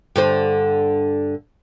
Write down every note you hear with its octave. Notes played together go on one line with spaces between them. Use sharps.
G2 D3 C5